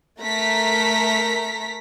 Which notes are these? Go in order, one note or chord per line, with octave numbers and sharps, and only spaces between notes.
A3 A#4 A#5 B6